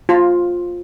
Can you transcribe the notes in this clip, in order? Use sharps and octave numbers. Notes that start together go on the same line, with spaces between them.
F4